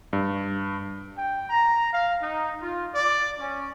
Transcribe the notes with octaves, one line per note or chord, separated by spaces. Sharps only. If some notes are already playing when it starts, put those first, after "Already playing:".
G2
G5
A#5
F5
D#4
F4
D5
C#4